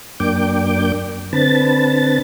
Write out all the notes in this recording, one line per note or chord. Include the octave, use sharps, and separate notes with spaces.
F#2 A#3 D4 G5 D6
D3 C4 B4 A5 A6